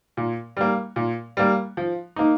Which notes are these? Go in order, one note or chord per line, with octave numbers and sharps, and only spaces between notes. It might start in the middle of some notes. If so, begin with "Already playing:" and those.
A#2
G3 A#3
A#2
G3 A#3
F3
A#3 D#4